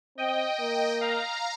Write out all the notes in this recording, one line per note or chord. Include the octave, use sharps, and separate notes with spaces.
C4 D#5 G5
A#3
F5 A#5